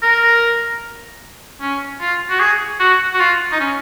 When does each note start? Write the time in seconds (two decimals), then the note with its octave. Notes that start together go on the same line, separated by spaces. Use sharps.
0.02 A#4
1.61 C#4
2.01 F4
2.30 F#4
2.40 G#4
2.80 F#4
3.13 F#4
3.20 F4
3.52 D#4
3.60 C#4